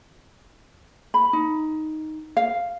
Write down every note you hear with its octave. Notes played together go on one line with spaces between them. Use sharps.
B5
D#4
F5